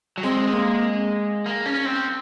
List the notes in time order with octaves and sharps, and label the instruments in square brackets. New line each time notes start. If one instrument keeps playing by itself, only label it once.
[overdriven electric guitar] F#3
[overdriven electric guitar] G#3 [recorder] C4
[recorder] A#3
[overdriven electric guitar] A#3
C#4
C4